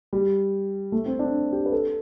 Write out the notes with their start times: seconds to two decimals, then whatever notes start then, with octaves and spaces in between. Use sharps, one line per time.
0.13 G3
0.92 A3
1.06 C4
1.19 D4
1.52 G4
1.66 B4
1.73 A4